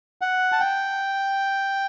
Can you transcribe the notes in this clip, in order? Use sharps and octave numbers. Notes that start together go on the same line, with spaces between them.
F#5
A5
G5